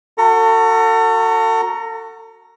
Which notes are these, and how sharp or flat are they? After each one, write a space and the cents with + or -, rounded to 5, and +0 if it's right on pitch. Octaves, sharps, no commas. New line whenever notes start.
F#4 -5 A4 +35 A#5 +0